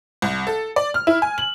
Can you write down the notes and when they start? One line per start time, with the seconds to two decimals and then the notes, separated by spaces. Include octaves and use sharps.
0.22 C2
0.47 A4
0.76 D5
0.94 F6
1.07 E4
1.22 G#5
1.38 F#7